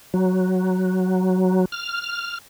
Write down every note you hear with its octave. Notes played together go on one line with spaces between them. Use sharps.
F#3
F6